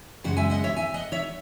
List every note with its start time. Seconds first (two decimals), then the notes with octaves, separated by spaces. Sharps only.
0.24 F#2 C#3 G#3 F#5
0.37 E5 G#5
0.50 D#5 F#5
0.64 C#5 E5
0.76 E5 G#5
0.94 D#5 F#5
1.12 C#5 E5